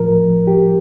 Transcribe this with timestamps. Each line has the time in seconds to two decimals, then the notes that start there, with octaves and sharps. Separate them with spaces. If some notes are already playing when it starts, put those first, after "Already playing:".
Already playing: A2 F3 A#4
0.47 G4